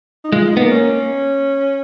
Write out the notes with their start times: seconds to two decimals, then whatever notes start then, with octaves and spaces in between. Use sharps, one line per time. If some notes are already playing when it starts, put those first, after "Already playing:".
0.24 D#4
0.32 G#3 F4
0.45 F4
0.52 B3 D#4
0.62 A#3
0.71 C#4